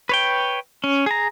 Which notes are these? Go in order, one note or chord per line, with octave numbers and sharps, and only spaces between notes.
B4 C#5 G5
C#4
G#4 A#5